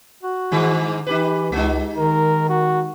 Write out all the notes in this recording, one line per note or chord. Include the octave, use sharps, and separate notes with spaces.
F#4
G#2 D#3 G#3
E3 D#4 G4 B4
C#2 G#3 D#4
D#3 A#4
F#4